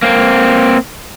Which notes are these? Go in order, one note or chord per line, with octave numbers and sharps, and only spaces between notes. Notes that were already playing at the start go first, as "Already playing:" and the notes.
A#3 C4